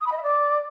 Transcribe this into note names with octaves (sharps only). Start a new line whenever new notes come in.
D#6
B5
D#5
E5
D5